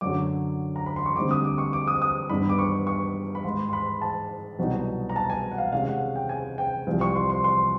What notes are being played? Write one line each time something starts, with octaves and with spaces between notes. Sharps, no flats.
F#2 D3 F#3 D6
A#5
B5
C6
C#6
D2 D3 G3 C4 D#4 D6
D#6
D6
C#6
D6
D#6
D#6
G2 D#3 G3 B3 B5
D6
C#6
C#6
B5
G#2 D#3 G#3 C6
C6
B5
A5
C2 B2 F#3 B3 D#4
A#5
A5
G#5
F#5
F5
C3 D#3 G#3 C#4 F5
F#5
G5
G#5
G5
C2 C3 F3
C#6
C6
C6
C6